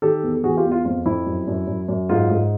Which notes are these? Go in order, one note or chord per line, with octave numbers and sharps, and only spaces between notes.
D#3 G4 A4
E2
E3 F#4 G#4
F4 G4
E2
F4
F2 F4
F2 E4
F#2
F#2
F#2
F#2
G#2 F4
G#2